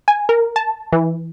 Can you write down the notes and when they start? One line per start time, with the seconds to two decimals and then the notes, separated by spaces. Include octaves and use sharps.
0.08 G#5
0.29 A#4
0.56 A5
0.93 E3